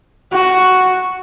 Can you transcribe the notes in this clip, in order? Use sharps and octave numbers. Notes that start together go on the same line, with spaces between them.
F#4